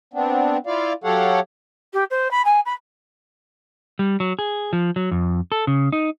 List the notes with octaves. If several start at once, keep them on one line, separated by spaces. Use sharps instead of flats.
B3 C4 D4
E4 F4 D5 F5
F#3 G4 A4 C#5 F5 F#5
G4
C5
B5
G#5
B5
G3
F#3
G#4
F3
F#3
F2
A4
C#3
D#4